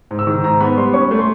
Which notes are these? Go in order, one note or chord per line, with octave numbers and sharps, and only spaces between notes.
G#2
E6
D#3
G#2 A#5
B3 B5
G3 C6
C#4 C#6
A3
C6